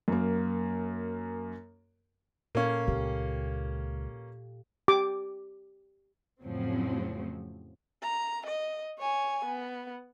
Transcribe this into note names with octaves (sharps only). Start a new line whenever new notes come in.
F#2 A#3
A#2 A#3 C#4 A4 F5
C#2 G4
G4 D6
F2 A2 C#3 F3 F#3 C4
A#5
D#5
C#5 G#5
B3